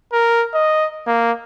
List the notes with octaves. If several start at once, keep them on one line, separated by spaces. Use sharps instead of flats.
A#4
D#5
A#3